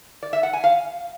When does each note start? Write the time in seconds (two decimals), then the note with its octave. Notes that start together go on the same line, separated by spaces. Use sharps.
0.23 D5
0.33 E5
0.43 F#5
0.53 G#5
0.64 F5